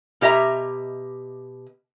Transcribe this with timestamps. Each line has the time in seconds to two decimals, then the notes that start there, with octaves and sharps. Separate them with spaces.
0.21 B2 G4 D#5 E5 A#5